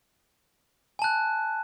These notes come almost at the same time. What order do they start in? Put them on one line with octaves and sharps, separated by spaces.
G#5 A5 F#6